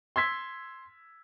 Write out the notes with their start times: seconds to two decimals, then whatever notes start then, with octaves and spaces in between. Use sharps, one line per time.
0.16 C6 E6 G#6 B6